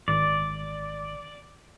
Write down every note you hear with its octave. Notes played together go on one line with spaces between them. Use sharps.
G#1 D5